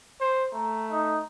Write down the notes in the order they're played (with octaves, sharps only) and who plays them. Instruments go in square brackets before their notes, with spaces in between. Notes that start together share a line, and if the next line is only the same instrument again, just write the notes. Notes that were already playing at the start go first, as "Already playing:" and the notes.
[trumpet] C5
[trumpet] A3 [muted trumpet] A#5
[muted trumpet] D#4